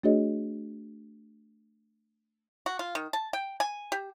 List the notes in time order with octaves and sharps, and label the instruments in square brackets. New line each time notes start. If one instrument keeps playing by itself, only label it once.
[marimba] A3 D4 F#4 G#4 C#5 D#5
[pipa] F#4
F4
D#3
A5
G5
G#5
G4